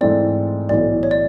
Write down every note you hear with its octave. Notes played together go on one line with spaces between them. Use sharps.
G#2 E3 A3 C4 D5
B1 A2 E3 D5
C#5
D5